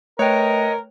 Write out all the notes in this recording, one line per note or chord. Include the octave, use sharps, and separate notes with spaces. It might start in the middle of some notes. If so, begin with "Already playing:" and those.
A3 A#4 B4 C#5 D#5 G5